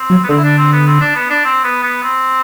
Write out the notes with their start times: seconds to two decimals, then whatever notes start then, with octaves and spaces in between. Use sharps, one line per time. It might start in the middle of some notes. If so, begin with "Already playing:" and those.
Already playing: C4
0.10 F#3
0.24 B3
0.29 D3 C4
0.37 E4
0.43 D4
0.58 C4
0.72 B3
0.87 C4
1.01 D4
1.15 B3
1.30 D4
1.45 C4
1.64 B3
1.83 B3
2.03 C4